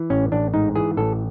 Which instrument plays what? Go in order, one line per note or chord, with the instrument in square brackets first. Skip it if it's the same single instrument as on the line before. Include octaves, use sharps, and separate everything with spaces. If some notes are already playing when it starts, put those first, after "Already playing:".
Already playing: [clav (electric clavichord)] E3
A1 C#4
A1 D4
G#2 D#4
E3 G#4
A1 A4